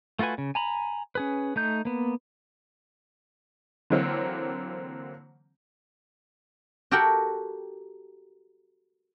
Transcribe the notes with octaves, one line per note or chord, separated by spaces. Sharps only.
A3 F4 F#4 B4 G#5
C#3
G#5 A#5 B5
C#4 G#4 B4
A3 D#4 G6
A#3 B3
D3 E3 F#3 A#3 C4
F#4 G4 A4 A#4 F#5 G5